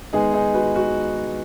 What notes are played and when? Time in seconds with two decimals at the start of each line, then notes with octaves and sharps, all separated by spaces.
0.13 D#3 G#3 B3 D#4 G#4
0.34 D#4 G#4
0.54 F#4 B4
0.75 F#4